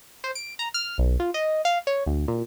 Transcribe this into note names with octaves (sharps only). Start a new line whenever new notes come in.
C5
D7
A#5
F6
B1
F4
D#5
F5
C#5
D2
A#2